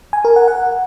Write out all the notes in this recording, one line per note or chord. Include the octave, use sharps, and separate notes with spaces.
G#5
A#4
F#5
F#5